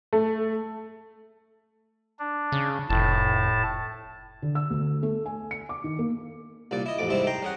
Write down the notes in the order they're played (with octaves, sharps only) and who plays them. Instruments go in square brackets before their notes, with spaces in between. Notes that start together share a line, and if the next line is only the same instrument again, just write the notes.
[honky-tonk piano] A3
[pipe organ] D4
[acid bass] C#3
[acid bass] F1 [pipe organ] A2 A5
[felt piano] D3
E6
D2
A3
G#5
C#7
D6
D#3
A#3
[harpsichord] C2 A#2 D5
E4 D#5
A1 F2 D6
G#2 C3 G3 C4 E4
G5 A#5 C6
C#4 G#4 F#5